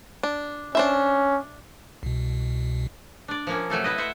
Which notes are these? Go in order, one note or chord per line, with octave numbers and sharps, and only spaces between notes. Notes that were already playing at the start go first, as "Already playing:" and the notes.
D4
C#4 D4 C5 E5
C2 B2
D4 D5
F3 A#3 C#4
C3 F#3 A3 A4
E4 B4 D#5
C5 E5 F#5